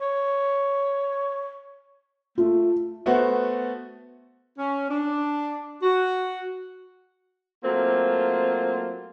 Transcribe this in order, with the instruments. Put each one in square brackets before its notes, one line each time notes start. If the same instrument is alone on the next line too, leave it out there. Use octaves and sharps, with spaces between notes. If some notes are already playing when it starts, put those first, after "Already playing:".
[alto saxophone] C#5
[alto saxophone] A3 [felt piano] F4
[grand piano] A3 B3 F#4 B4 C5
[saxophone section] C#4
D4
F#4
[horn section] F#3 A3 A#3 C4 F4